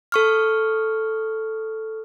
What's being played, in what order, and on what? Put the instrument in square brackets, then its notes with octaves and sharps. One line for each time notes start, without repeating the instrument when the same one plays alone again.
[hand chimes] A4 C#6 F6